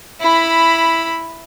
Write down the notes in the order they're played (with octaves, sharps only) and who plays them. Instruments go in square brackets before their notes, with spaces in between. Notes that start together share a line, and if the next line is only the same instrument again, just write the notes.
[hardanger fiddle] E4 B5